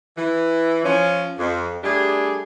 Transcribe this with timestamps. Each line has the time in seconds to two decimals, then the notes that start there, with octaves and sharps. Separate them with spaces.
0.17 E3
0.85 F3 C#4
1.38 F2
1.83 G3 A3 D4 G4 G#4